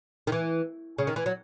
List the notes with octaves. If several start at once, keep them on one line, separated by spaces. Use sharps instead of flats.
D#3
E3
C#3
D#3
E3
F#3